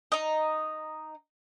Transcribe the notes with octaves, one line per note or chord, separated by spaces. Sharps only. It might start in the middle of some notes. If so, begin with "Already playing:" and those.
D#4 D#5